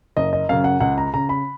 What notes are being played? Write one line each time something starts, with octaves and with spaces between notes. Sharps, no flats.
F#1 D#5
D#5
F#2 C#3 F5
F#5
C#2 F#5
A#5
C#3 A#5
B5